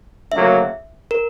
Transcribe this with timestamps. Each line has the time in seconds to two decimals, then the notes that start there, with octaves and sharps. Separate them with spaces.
0.32 D2 C#3 F#3 A#3 E5
1.11 A#4